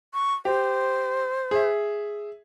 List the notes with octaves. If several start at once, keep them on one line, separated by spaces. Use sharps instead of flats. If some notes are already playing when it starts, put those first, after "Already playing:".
C#6
G4 C5
G#4 E5